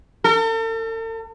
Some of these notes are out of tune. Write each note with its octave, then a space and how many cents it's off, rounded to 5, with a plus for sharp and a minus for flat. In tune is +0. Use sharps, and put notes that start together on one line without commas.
A4 +45